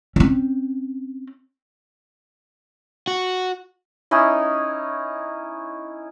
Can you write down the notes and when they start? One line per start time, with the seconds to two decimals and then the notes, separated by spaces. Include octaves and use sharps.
0.16 C4 C#4
3.07 F#4
4.11 C#4 D#4 E4 D#5